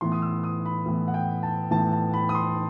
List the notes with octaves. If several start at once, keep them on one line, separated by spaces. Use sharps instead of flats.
A2 E3 B3 C6
D#6
E6
D#6
B5
A2 E3 B3
F#5
G5
A5
A2 E3 B3 A5
A5
B5
D#6
C6